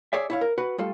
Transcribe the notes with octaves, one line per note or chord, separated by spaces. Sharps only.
G#4 C#5 D5 E5
E4 C#5 F5
A#4
F#4 B4
G3 A3 F4 A4